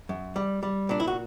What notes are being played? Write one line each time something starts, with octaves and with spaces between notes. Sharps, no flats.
F#2
G3
G3
A#2 D4
E4
F#4